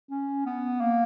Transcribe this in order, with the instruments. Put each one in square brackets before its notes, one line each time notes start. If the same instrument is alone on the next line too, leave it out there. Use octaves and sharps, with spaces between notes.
[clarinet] C#4
B3
A#3